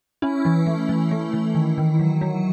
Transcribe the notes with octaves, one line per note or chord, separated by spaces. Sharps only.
C#4 E4
E3
A3
E3
A3
E3
D#3
D#3
F#3
F#3